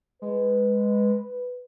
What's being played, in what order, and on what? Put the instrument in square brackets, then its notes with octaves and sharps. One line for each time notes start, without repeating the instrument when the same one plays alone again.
[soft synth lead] G#3 [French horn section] B4